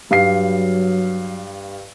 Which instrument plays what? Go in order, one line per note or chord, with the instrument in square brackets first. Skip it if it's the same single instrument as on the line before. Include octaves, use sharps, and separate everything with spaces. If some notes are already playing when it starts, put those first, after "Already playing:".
[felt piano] G2 F5 C7 [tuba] F#3